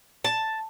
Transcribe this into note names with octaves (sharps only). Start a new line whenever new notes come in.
A5